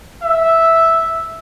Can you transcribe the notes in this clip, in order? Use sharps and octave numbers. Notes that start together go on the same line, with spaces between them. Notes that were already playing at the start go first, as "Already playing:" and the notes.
E5